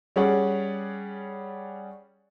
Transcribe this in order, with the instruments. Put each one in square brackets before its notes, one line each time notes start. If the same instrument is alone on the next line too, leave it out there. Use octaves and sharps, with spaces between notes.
[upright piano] G3 C#4 G#4 C#5 D5 F#5